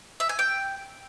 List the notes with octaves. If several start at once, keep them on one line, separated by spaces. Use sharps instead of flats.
E5
G#5
G5